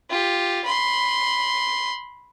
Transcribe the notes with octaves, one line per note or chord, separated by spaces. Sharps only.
F4 G4
B5 C6